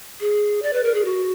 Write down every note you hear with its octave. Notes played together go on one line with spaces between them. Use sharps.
G#4
D5
B4
A#4
G#4
F#4